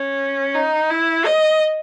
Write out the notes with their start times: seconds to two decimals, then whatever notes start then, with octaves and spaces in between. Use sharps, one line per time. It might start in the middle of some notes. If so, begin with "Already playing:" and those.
Already playing: C#4
0.55 D#4
0.90 E4
1.25 D#5